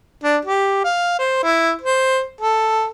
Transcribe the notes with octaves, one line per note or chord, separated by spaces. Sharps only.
D4
G4
F5
C5
E4
C5
A4